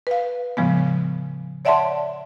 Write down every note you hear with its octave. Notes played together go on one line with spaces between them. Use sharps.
B4 F5
A2 C#3 F3 G#3 B3
C#5 D5 E5 F#5 A5 C6